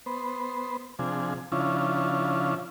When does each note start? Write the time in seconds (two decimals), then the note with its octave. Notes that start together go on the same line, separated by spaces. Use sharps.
0.06 B3 C5
0.99 C3 F3 D4 G#4
1.52 C#3 F3 C#4 D4 E4 F4